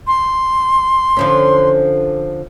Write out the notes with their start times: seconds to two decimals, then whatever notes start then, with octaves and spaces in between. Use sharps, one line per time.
0.07 C6
1.17 D3 F3 C#4